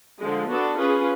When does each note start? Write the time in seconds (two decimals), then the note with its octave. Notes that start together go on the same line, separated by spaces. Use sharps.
0.20 D3 F3 G#3
0.49 B3 D4 F#4 A4
0.77 C#4 F4 G#4 B4